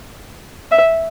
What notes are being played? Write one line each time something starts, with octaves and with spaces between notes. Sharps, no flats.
E5